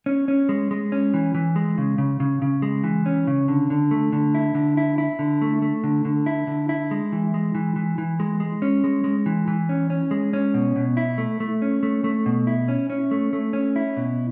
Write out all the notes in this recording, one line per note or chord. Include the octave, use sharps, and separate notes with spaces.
C#4
C#4
G#3
G#3
C#4
E3
E3
G#3
C#3
C#3
C#3
C#3
G#3
E3
C#4
C#3
D3
D3
A3
D3
E4
D3
E4
E4
D3
A3
A3
D3
D3
E4
D3
E4
G#3
E3
G#3
E3
E3
E3
G#3
G#3
C#4
G#3
G#3
E3
E3
C#4
C#4
G#3
C#4
B2
B2
E4
A3
A3
C#4
A3
A3
B2
E4
C#4
C#4
A3
A3
C#4
E4
B2